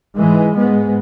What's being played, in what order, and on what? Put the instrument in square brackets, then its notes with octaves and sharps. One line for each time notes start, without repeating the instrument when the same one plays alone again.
[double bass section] G#2 E3 G#3
G#2 G#3 B3